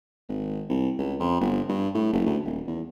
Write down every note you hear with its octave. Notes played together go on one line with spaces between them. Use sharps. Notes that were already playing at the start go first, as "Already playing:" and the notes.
G#1
C2
C#2
F2
G1
G2
A2
F#1
D2
D#1
E2